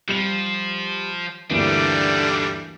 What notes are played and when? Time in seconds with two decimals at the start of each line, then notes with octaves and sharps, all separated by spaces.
0.09 F3 G3 C#7 F7
1.50 D2 G2 D3 E3 G3 A#3 D4 D#4